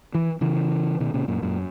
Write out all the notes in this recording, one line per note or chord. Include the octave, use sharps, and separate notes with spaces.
E3
C#3 E3
B2 D#3
A#2 C#3
F#2 A#2
F#2 A#2